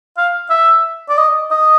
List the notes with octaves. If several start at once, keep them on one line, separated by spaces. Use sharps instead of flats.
F5
E5
D5
D#5
D#5